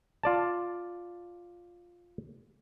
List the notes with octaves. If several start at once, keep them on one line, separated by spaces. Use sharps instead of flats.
F4 D5 A5